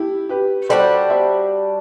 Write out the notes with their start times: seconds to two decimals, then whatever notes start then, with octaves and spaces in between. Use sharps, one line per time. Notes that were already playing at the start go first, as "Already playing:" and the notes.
Already playing: A3 E4 G4
0.29 G4 B4
0.69 G3 D4 F#4 A4 C5
1.10 C5 E5